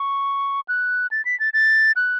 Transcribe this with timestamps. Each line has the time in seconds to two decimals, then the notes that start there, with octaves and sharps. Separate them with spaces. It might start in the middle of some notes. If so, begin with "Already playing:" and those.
Already playing: C#6
0.69 F#6
1.11 A6
1.25 B6
1.40 A6
1.53 A6
1.96 F#6